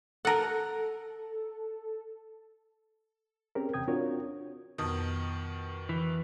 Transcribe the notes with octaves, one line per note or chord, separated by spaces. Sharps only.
A4 A#4 F#5
C4 C#4 G4 G#4 A#4
E2 C3 G5 D#6 G#6
C4 D4 F4 F#4 A#4 C#5
F2 B2 D#3 D#6
E3